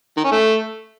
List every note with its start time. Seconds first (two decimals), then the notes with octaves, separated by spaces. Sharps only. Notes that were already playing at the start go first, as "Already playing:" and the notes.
0.17 D#3
0.24 C#4
0.32 A3